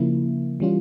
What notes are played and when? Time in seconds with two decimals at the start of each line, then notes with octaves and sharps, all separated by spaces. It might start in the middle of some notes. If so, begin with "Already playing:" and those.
Already playing: C#3 F3 A#3 E4
0.60 E3 G3 C#4 F4